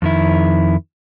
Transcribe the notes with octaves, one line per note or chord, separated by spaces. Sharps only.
F2 D#3 E4